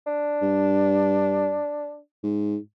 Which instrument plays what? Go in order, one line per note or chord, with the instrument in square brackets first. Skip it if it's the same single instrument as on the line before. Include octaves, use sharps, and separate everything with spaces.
[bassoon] D4
[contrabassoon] G2
G#2